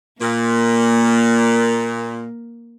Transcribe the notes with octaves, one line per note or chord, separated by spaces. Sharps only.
A#2 A#3